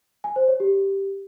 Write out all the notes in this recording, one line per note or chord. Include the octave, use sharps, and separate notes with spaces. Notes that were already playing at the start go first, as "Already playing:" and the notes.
G#5
C5
C#5
G4